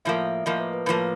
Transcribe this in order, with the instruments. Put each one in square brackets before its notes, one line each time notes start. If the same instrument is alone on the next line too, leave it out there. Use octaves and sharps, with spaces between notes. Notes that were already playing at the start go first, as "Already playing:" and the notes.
[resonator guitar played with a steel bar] A2 F3 A#3 [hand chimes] E5
[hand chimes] E5
[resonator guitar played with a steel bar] A2 F3 A#3 [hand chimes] D#5
[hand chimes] B4
B4
[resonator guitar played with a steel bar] A2 F3 A#3 [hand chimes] B4